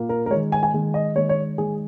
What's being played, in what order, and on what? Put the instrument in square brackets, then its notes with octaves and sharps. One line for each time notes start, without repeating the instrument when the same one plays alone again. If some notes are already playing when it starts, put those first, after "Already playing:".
Already playing: [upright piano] A#2 A#3
A#4
A#4
G#3 C#5
D#3
G#5
G#5
D#3 G#3
D#5
D#3 G#3 C#5
C#5
D#3 G#3 G#4